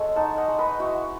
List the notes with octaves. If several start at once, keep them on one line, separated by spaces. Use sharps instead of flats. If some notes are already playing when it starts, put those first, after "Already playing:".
Already playing: G#3 F#4 A4 C#5
D#4 F#5 A5
D#5 F#5
G#3
B4 D#5
E4 F#4